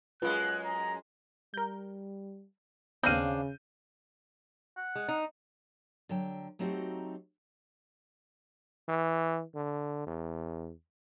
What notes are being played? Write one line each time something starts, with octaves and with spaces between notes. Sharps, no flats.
F#2 G#3 F4 B4 F#6
A#5
G3 A#4 G6
D#2 C#3 B3 C4 D4 F5 G6 D#7
F#5
G#3
D#4
D3 F#3 G5
F#3 A3 C4 D#4 F#4 G4
E3
D3
E2